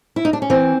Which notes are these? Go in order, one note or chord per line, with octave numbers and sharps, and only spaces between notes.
E4
D#4
D4
C#4
E3 C4